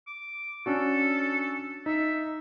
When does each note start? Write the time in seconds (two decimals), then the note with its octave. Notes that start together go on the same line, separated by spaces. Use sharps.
0.07 D6
0.66 C#4 D4 F#4 A4
1.86 D#4 E5